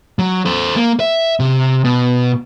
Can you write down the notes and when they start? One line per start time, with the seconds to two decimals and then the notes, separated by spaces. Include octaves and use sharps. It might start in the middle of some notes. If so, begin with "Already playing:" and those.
0.19 F#3
0.45 A4 C5
0.76 A#3
1.00 E5
1.40 C3
1.84 B2